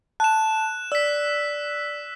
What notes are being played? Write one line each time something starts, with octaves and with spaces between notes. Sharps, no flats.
A5 F#6 E7
D5 E6 B6